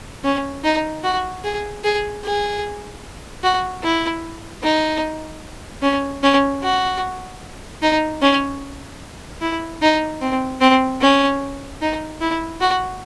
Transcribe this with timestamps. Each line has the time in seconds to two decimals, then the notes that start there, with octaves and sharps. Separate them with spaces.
0.24 C#4
0.64 D#4
1.03 F#4
1.44 G#4
1.84 G#4
2.24 G#4
3.43 F#4
3.83 E4
4.63 D#4
5.82 C#4
6.23 C#4
6.62 F#4
7.82 D#4
8.22 C#4
9.41 E4
9.82 D#4
10.21 C4
10.61 C4
11.01 C#4
11.81 D#4
12.21 E4
12.61 F#4